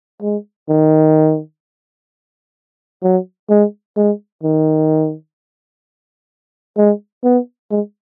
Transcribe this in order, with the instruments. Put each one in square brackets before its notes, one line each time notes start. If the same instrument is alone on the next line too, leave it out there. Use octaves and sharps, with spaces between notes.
[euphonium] G#3
D#3
F#3
G#3
G#3
D#3
G#3
B3
G#3